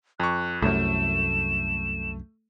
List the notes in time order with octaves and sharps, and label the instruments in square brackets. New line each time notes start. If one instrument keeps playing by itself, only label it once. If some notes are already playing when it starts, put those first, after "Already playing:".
[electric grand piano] F2 C#6 [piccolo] F#6
[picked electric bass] C2 F#2 [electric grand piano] A3 [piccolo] E7